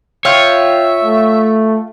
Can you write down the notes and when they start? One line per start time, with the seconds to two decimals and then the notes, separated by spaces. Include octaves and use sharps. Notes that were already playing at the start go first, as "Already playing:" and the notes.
0.25 F4 C#5 E5 F5 G5
1.04 A3